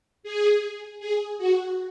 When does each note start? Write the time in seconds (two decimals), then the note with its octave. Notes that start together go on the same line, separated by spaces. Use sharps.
0.23 G#4
1.00 G#4
1.38 F#4